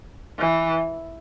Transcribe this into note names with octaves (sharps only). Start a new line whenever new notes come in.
E3